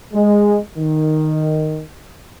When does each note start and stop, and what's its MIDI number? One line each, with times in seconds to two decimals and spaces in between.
0.14 0.58 56
0.78 1.83 51